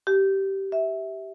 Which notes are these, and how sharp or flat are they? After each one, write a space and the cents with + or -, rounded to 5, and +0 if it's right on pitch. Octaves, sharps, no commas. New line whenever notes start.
G4 -15
E5 -15